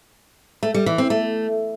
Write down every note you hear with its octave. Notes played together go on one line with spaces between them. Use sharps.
A3
G3
E3
C4
A3